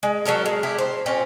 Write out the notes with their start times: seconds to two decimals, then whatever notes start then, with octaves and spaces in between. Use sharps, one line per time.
0.03 G#3
0.26 F#3 C#4 A4 A#4
0.46 G#3
0.63 E4 G4 A#4
0.78 C5
1.06 A#2 C4 C#4